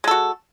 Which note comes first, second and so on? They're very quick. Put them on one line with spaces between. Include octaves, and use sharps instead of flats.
G#3 A4 F#4